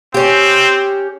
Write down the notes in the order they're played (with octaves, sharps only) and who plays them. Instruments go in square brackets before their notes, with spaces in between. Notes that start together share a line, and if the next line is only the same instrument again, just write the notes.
[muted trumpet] C4 [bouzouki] C#4 G4